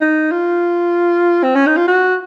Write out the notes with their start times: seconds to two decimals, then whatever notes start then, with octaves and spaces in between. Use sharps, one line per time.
0.01 D#4
0.31 F4
1.43 C4
1.55 C#4
1.66 D#4
1.77 F4
1.88 F#4